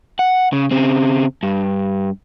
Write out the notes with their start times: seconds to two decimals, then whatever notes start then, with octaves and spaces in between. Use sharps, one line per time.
0.19 F#5
0.53 C#3
0.71 C#3 C4
1.43 G2